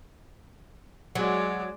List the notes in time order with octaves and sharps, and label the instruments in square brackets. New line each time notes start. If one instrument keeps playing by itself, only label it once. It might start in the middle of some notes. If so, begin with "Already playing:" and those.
[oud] F#3 [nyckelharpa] G#3 D5